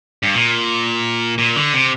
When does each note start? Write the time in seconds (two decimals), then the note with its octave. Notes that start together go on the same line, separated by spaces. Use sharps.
0.23 G2
0.34 A#2
1.38 A#2
1.56 D3
1.74 C3